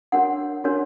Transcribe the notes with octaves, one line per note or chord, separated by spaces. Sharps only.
D4 F#4 A#4 C#5 F#5
D4 F#4 A#4 C#5